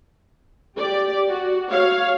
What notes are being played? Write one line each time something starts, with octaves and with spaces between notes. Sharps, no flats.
G4 D5
F#4
C#5 F5